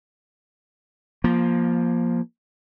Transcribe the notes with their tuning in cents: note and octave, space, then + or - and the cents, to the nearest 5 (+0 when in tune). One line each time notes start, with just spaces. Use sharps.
F3 +0 A#3 +20